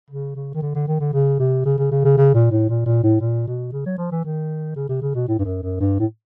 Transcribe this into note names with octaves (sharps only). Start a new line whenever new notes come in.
C#3
C#3
D#3
D3
D3
D#3
D3
C#3
C3
C#3
C#3
C#3
C#3
C#3
A#2
A2
A#2
A#2
A2
A#2
B2
C#3
F#3
F3
E3
D#3
C#3
C3
C#3
B2
A2
G2
F#2
F#2
G2
A2